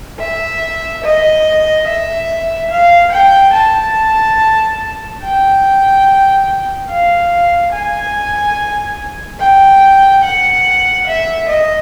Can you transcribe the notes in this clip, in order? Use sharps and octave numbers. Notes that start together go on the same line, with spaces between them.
E5
D#5
E5
F5
G5
A5
G5
F5
G#5
G5
F#5
E5
D#5